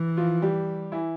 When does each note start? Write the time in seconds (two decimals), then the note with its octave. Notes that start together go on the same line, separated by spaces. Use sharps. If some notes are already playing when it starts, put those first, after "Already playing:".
Already playing: E3
0.17 F3 F4
0.42 G3 G4
0.92 E3 E4